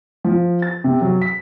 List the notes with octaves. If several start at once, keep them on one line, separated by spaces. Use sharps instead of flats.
F3
A6
C3
F#3
B6